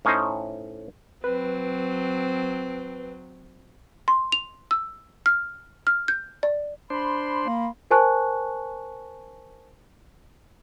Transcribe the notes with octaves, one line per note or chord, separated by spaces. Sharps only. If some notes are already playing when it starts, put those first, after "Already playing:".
A2 C#4 D#4 C5 D#5
F#3 C4 B4
C6
F7
E6
F6
F6
G6
D5
D4 C5 B5 C6
A#3
A#4 C5 G#5 A5 C#6 F#6